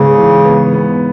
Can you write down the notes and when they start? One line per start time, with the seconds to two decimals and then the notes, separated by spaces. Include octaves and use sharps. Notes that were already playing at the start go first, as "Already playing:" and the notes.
Already playing: G#2 C#3 B3
0.17 E3
0.45 B3
0.74 B3